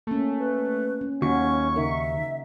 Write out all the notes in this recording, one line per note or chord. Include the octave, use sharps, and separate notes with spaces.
A3 A#3 C#4
B4
C#4
D#2 C#4 F#4 C#6
C#3 D#4 A#4 E5